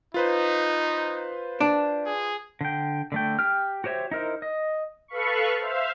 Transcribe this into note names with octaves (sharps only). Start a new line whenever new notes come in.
D#4 F4 B4 C5
D4
G#4
D3 G5
D3 A3 G5
G4 G5 F6
F#4 G4 C5 C#5 E5
D#4 E4 A#4 C5
D#5
A4 B4 F5 B5 C#6
C5 E5 F5